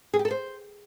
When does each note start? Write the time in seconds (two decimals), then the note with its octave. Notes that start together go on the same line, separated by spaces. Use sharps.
0.14 G#4
0.19 G4
0.25 A4
0.31 C5